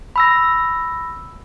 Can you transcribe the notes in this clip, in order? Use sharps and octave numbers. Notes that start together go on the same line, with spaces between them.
B5 E6 A#6